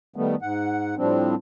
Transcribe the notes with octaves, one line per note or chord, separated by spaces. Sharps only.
D#3 G3 A3 B3
G#2 F#5
A2 F3 G3 C4 D4